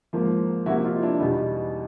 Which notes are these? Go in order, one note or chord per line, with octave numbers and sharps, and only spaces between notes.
G#2 F3 A#3
C3 F3 A#3 E4 F#4
D#4 F4
D4 E4
E2 B2 G3 B3 D#4